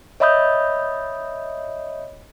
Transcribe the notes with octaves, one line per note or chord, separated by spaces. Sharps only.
C#5 D#5 E5 B5 D#6 G6